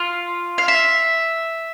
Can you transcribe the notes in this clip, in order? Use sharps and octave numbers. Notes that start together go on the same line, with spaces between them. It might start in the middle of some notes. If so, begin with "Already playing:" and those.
Already playing: F4
F5
E5